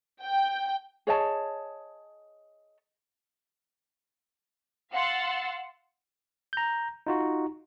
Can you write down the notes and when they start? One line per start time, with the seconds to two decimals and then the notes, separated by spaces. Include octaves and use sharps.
0.22 G5
1.07 G#4 C#5 D#5 A5
4.92 F5 F#5 C6 E6 A6
6.53 A#5 G6
7.07 D#4 F4 F#4